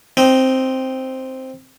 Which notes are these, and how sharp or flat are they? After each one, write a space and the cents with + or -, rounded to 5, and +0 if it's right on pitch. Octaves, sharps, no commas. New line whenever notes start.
C4 +0 D#4 +0